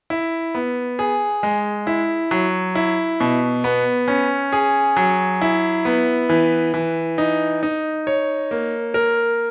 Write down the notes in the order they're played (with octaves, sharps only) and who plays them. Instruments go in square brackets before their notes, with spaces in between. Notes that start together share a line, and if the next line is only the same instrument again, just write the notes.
[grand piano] E4
B3
G#4
G#3
E4
F#3
E4
B2
B3
C#4
G#4
F#3
E4
B3
E3
E3
D#4
D#4
C#5
A#3
A#4